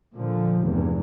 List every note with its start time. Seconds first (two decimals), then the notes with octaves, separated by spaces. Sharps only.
0.13 A#2 D3 F3
0.62 F1 E2 G2